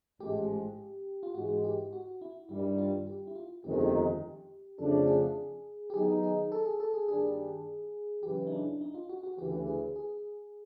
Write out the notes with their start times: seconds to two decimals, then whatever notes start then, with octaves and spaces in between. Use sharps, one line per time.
0.20 A1 G#2 F3 G#3 G4
1.23 F4
1.35 G#2 E3 G#3 F#4
1.64 G4
1.93 F#4
2.21 E4
2.49 G2 D#3 G3 E4
2.78 F4
3.07 G4
3.27 E4
3.35 F4
3.64 G1 F2 C3 D#3 G#3 G4
3.73 G#4
3.81 G4
4.78 F2 C#3 F3 A3 D4 A4
5.07 G#4
5.90 G4
5.94 D#3 F#3 B3 D#4 G#4
6.23 G#4
6.52 A4
6.65 G#4
6.80 A4
6.94 G#4
7.08 G2 D#3 G3 A#3 D4 G#4
8.23 F#2 C#3 E3 G4
8.47 D#4
8.52 D4
8.81 D#4
8.95 F4
9.09 F#4
9.23 F#4
9.38 D2 C#3 E3 G4
9.67 G#4
9.96 G#4